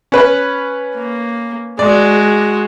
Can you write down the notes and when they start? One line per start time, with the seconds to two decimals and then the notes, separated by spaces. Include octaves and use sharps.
0.12 C#4 B4
0.97 A#3
1.79 G#3 F#4 D5